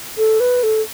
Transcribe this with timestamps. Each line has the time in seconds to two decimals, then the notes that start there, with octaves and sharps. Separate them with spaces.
0.18 A4
0.40 B4
0.63 A4